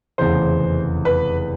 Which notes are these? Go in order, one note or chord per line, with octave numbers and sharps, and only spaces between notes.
F1 E2 C#3 E3 C5
B4